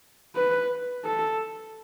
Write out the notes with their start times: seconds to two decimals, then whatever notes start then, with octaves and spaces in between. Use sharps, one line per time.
0.35 B4
1.05 A4